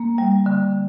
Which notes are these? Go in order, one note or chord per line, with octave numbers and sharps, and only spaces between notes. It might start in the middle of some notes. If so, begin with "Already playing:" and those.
Already playing: A#3
G3
D3